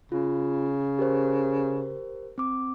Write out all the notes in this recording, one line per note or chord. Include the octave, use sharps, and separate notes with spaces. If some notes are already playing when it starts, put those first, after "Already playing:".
C#3 F4
G4 A#4 C5
C4 D6